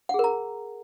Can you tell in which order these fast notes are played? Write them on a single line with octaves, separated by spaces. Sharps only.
F#5 G#4 A#4 A#5